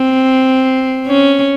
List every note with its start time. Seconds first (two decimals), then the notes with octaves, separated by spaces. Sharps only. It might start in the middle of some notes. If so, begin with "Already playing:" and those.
Already playing: C4
1.07 C#4